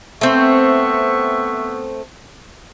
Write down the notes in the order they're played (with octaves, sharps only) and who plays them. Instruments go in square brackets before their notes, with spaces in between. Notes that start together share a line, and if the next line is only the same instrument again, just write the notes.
[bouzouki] A3 C4 [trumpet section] B3 E5 C#6